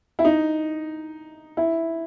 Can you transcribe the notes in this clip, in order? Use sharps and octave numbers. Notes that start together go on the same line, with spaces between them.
E4
D#4
E4